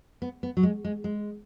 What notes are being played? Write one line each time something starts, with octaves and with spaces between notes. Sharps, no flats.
B3
B3
F#3
G#3
G#3
G#3